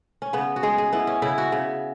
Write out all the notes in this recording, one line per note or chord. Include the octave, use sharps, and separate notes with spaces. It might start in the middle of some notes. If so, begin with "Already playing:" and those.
C#4
C#3 B3
F#4
G#3 G#4
G#4
B3 E4
C#4
C#3 E4
F#4
C#3